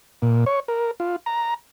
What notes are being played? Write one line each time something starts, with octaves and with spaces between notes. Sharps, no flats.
A#2
C#5
A#4
F4
A#5